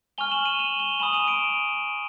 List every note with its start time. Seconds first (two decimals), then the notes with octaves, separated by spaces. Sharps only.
0.18 G#5 C#6 F6 F7 G7
0.32 E7 F#7
0.45 D#7 F7
0.59 E7 F#7
0.79 F7 G7
1.00 G#5 B5 D#6 E7 F#7
1.13 D#7 F7
1.27 D7 E7